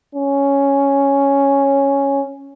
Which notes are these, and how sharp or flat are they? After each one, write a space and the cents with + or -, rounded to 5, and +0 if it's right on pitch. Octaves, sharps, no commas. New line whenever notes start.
C#4 +0